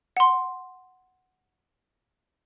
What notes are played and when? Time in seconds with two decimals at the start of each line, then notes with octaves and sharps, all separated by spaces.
0.17 F#5 C6